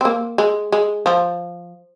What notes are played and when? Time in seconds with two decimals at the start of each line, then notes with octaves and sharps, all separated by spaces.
0.01 C4
0.05 A#3
0.38 G#3
0.72 G#3
1.06 F3